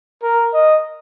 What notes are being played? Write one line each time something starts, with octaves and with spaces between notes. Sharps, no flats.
A#4
D#5